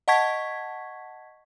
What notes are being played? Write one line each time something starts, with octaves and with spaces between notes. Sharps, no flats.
D#5 F#5 A5 C#6 G#6 B6